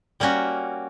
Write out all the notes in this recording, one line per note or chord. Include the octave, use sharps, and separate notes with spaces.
G3 A#3 C#4 F#4